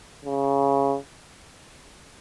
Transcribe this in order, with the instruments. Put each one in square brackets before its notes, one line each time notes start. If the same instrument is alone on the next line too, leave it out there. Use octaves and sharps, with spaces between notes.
[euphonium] C#3